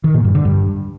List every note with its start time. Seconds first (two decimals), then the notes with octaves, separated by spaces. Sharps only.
0.04 D#3
0.14 A#2
0.25 G2
0.35 D3
0.45 G2